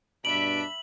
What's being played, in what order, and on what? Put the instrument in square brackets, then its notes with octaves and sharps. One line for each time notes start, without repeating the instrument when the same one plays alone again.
[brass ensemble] G2 B2 D4 [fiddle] E5 B5 [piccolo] D7 [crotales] F#7